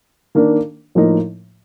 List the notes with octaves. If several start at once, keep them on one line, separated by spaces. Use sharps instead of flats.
D#3 A#3 D4
A2 F3 A#3 D#4